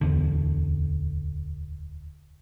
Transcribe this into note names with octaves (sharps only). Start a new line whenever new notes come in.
D1 G#1 E2 D3